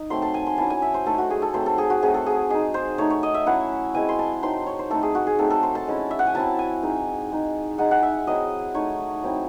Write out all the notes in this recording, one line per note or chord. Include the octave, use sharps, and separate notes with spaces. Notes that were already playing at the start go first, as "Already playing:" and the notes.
Already playing: D#4
F#3 A3 C4 C6
A5
G#5
C6
F#3 C#4 E4 A5
G#5
E5
C5
A3 D#4 A4
F#4
G#4
A4
F#3 A3 C4 C5
A4
G#4
F#4
F#3 A3 C4 G#4
A4
G#4
G#3 D#4 G#4
C5
A3 D#4 C#5
C#5
D#5
E5
F#3 C#4 E4 F#5
G#3 C4 E4 G#5
C6
A5
F#3 C4 D#4 C6
C#5
C5
A3 C4 D#4 A4
G#4
F#4
G#4
F#3 A3 C4 D#4 A4
A4
C5
A5
G#3 C#4 E4
E5
F#5
G#5
F#3 C4 E4 A5
G#5
G#3 C4 D#4
G#3 D#4
G#3 D#4 F#5
F#5
E5
F#3 C4 E4 D#5
A3 D#4 C#5
F#3 C4 E4